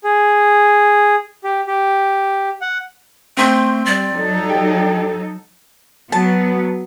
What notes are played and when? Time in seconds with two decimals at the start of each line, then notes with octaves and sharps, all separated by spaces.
0.04 G#4
1.44 G4
1.67 G4
2.61 F#5
3.37 A3 C4 C6 G6
3.85 G3 D5
4.14 F#3 D#4 A4
4.49 G4
6.12 F#3 B3 A5